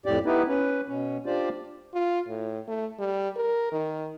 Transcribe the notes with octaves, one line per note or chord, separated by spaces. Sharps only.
F2 A2 G4 D5
B3 D#4 E4 G4 B4
C#4 B4
B2 C#4
D4 F4 G4 C5 D5
F4
A2
A3
G3
A#4
D#3